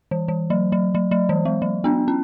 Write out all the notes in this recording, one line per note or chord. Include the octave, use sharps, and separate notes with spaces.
E3
E3
F#3
F#3
F#3
F#3
E3
G#3
F#3
B3 D4
C#4